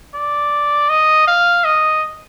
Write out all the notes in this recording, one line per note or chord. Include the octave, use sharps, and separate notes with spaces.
D5
D#5
F5
D#5